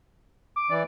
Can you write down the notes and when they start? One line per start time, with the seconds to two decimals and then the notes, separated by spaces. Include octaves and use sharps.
0.56 D6
0.70 E3 D5